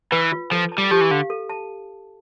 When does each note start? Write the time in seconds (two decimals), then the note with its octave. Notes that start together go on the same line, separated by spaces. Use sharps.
0.12 E3 B4
0.32 F4
0.52 F3 A4
0.72 A5
0.78 G3
0.91 F3 G4
1.01 E3
1.11 D3 F5
1.30 A4
1.49 A5